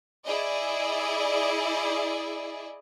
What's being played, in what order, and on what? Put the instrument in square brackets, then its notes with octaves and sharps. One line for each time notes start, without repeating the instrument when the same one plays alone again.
[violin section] E4 G#4 D5 D#5